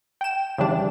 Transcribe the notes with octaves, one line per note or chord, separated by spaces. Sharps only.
G5 E7
C#3 E3 G3 D4